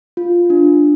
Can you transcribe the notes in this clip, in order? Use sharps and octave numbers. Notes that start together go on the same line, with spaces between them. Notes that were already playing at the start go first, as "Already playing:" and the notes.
F4
D4